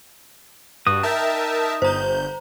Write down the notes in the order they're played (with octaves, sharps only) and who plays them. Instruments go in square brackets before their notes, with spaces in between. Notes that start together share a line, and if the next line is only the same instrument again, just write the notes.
[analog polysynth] G2 [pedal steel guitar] F#4 D#6
[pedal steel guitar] D#4 G5 [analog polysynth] A#4 E5 A5
[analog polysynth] G1 G6 [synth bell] C5 A#5